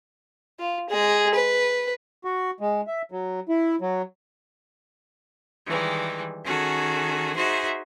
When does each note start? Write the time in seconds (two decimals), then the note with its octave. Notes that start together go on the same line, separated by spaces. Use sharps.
0.60 F4
0.90 G#3 G#4
1.34 B4
2.25 F#4
2.60 G#3
2.87 E5
3.12 F#3
3.49 E4
3.81 F#3
5.67 D#3 E3 G3 G#3
6.45 D#3 C#4 F#4 G#4 A4
7.36 D#4 F#4 G#4 C5 E5